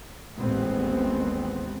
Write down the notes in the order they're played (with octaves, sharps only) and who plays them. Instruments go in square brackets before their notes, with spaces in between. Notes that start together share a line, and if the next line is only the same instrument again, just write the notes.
[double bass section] A1 D#2 G#3 B3 C4